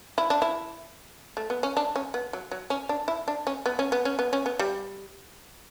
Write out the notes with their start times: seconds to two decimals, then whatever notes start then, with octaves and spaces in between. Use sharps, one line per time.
0.18 E4
0.30 D4
0.42 E4
1.37 A3
1.50 B3
1.63 C#4
1.77 D4
1.96 C#4
2.14 B3
2.33 F#3
2.51 F#3
2.70 C#4
2.89 D4
3.08 E4
3.28 D4
3.47 C#4
3.66 B3
3.79 C#4
3.92 B3
4.05 C#4
4.19 B3
4.33 C#4
4.46 B3
4.59 G3